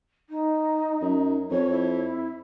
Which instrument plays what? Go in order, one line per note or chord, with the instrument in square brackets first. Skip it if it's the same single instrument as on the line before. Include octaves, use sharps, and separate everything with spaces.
[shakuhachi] D#4
[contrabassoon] F#2
[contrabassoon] F2 [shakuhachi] C#5
[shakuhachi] E4